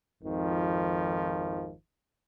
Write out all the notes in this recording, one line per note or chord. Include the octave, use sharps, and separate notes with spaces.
G#1 F2 D#3 F3